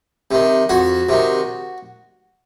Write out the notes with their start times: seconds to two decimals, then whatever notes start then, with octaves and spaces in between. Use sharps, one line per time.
0.31 C3 D#3
0.69 F2 F#4
1.09 C3 D#3